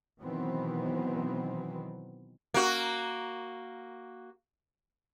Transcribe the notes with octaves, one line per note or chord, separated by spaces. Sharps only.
B2 D#3 E3 F#3 B3 C4
A#3 F#4